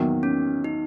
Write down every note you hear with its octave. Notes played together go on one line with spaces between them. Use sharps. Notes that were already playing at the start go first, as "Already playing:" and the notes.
Already playing: E2 D#3 F#3 A#3
C#4
D#4